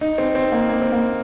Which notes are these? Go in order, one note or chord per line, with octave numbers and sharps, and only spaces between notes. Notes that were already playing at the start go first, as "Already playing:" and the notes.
D#4
C4
C4
A#3
A#3
C4
A#3